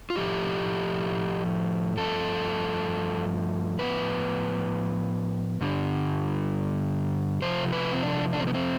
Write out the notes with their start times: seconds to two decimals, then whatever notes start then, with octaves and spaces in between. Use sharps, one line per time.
0.10 F4
0.15 A2 F3 A3 G4
1.97 G2 F3 A3 A4
3.79 A2 F3 B3 B4
5.61 G2 D3 G3
7.42 C3 F3 A3 C5
7.72 B4
7.93 C4
8.03 D4
8.33 D4
8.40 C4
8.47 B3
8.54 C4